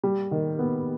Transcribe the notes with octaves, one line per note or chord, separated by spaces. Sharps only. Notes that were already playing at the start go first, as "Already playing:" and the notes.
G3
D#3
B3